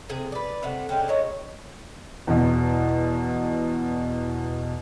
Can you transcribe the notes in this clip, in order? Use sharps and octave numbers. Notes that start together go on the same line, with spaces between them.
C3 G#4 G#5
B4 D5
C3 A3 F#5
G#3 C#4 D4 G5
A#2 G#3 C#5 A#5
E2 B2